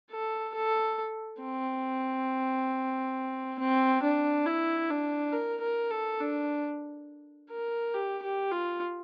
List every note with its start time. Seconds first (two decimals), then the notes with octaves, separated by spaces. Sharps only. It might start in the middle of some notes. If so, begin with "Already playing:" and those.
0.11 A4
0.55 A4
1.41 C4
3.59 C4
4.02 D4
4.45 E4
4.90 D4
5.32 A#4
5.61 A#4
5.90 A4
6.20 D4
7.50 A#4
7.94 G4
8.22 G4
8.51 F4